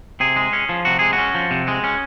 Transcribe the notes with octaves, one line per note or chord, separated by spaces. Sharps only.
C3 G#4
G#3
C#4
F3
C3 F#4
G#3 G#4
F#4
C#4
F3
C3
G#3
C#4